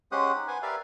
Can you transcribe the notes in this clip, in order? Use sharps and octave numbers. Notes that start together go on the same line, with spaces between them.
G#3 C#4 G4 C5 F#5 D#6
D#4
B4 C5 F#5 G#5
G4 A#4 B4 D5 E5 F5